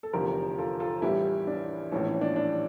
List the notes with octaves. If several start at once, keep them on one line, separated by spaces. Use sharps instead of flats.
A4
F1 E2 D3 F3 G4 A#4
F4 A4
F4 A4
A1 G2 E3 E4 G4
D4
A#1 A2 E3 C#4
C#4
D4
D4